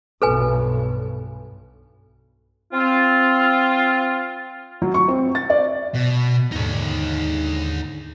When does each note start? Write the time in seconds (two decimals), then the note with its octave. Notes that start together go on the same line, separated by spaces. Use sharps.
0.22 B1 G2 A4 B4 G#5
2.73 C4 F4
4.82 F#3
4.94 C#6
5.08 C4
5.35 A6
5.50 D5
5.94 B2
6.52 D#2 G#2 D3 D#4 C#5